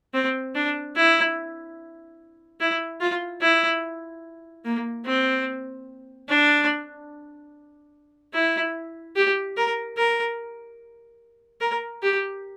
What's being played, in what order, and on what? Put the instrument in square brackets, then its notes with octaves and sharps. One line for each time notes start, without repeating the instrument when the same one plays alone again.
[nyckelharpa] C4
D4
E4
E4
F4
E4
A#3
C4
D4
E4
G4
A#4
A#4
A#4
G4